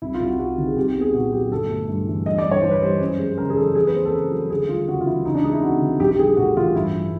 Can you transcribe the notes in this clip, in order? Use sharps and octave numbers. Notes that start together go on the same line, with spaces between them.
C2 E4
F4
C2
F#4
C3 F#4
D#3
G#4
C2 G4
B3
G#4
A#2 F#4
F#3 G4
G1 A4
A3
G2
E3
G2 D#5
D5
G2
C#5
E3 C5
B4
G3 C5
F#2
G#3
C#3 A#4
G#4
E3 A4
F2 G#4
B4
A#3 C5
A4
C#3 A#4
F#3 A4
D2 G#4
G3 F4
C#3 F#4
F4
E3 E4
C#2 D#4
D4
G#3 D#4
E4
C3 F#4
D#3
A#1 G4
G4
G3 G#4
A2 F#4
E3 F4
G2 E4
G2